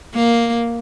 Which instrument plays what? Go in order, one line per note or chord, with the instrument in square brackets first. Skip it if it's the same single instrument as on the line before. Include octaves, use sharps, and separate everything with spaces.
[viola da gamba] A#3